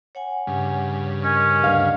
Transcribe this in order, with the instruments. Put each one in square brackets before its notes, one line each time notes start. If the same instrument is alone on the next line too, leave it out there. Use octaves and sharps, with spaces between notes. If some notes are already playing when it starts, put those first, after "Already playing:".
[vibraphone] C#5 F#5 G#5
[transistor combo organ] G2 C#3
[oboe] C#4 [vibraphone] A#4 D#5
[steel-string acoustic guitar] D2 F5